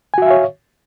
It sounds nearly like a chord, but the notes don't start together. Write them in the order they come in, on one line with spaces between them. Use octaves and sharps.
G#5 F#4 E5 F5 C#5